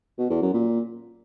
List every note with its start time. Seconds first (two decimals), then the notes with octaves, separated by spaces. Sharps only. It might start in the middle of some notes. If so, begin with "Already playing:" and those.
0.19 B2
0.30 E2
0.42 F#2
0.54 A#2